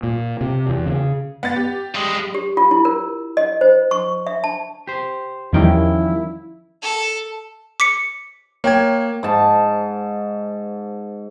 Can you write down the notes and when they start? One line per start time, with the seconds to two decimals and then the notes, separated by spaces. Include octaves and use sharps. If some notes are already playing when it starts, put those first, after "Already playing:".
0.03 A#2
0.41 C3
0.69 E2
0.86 C#3
1.43 B3 A6
1.56 G4
1.95 G2 G#3
2.35 G4
2.57 F4
2.71 E4
2.85 A#4
3.37 D#5
3.61 C5
3.91 C#6
4.27 E5
4.44 A5
4.87 G4 C5
5.53 E2 D#3 F3 G3 C#4 E4 G5
6.82 A4
7.80 D6 B6 C#7
8.64 A#3 C#5 G5 G#6
9.23 G#2 A5